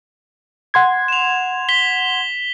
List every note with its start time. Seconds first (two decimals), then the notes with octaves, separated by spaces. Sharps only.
0.74 F#5 C6 G#6
1.08 E7 F7
1.69 B6 G7